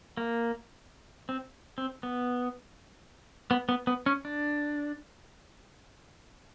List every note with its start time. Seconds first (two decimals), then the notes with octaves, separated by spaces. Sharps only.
0.17 A#3
1.29 C4
1.78 C4
2.03 B3
3.51 B3
3.69 B3
3.87 B3
4.06 C#4
4.25 D4